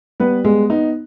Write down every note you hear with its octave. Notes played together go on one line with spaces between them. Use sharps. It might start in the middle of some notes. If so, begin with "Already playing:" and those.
G3 B3 B4
G#3 B3 G#4
B3 D#4